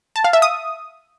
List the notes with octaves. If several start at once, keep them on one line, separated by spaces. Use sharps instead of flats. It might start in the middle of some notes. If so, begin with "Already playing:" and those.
A5
F5
E5
D#6